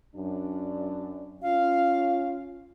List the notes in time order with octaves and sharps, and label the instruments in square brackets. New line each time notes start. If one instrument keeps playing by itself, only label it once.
[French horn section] F#2 D4
[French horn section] C#4 F4 [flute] F5